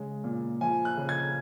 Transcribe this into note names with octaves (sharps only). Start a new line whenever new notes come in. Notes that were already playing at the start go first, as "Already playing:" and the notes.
Already playing: C#3 G#3
A#2
F3 G#5
F#6
C#3
G#6